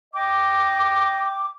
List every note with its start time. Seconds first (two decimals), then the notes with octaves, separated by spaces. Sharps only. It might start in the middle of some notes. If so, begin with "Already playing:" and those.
0.14 D#5 G5 D6